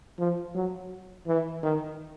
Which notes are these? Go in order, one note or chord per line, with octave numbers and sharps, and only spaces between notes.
F3
F#3
E3
D#3